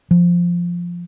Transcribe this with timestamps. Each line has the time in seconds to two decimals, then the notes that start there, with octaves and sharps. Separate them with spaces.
0.11 F3